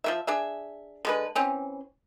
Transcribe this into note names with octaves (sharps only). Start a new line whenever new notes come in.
F3 A#3 E5
D4 G#4 E5
D3 G#3 B4
E3 C4 C#4